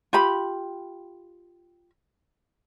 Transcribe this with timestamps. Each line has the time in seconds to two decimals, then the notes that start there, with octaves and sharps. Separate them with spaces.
0.13 F4 G4 B5